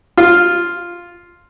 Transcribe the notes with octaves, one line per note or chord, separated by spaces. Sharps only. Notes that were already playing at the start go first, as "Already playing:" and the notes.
F4